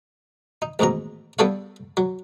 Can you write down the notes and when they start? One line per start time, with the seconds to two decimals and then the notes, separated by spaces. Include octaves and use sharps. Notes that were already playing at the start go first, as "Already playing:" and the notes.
0.62 D#4
0.79 A1 D#2 G#2 B2 A#5
1.39 G3 B3 D4 A4 C#5 F5
1.97 F#3